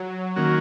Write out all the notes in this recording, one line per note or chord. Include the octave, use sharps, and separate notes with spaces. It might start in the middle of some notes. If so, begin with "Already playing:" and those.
Already playing: F#3
D#3 A#3 C#4 F#4